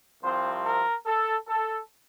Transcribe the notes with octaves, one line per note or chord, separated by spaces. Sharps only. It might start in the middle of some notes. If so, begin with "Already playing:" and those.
C2 C3 F3 C4 C5
A#4
A4
A4